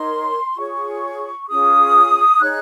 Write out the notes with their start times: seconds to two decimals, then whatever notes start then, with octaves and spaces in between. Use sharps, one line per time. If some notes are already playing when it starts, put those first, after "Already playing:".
Already playing: D#4 A#4 C#5 C6
0.56 F4 G#4 C#5 C#6
1.48 C#4 F4 G#4 D#6
2.40 D#4 G#4 C#5 F#6